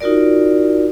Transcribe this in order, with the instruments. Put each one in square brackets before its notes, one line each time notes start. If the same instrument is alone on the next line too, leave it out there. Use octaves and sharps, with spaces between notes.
[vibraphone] D#4 F4 F#4 A#4 D5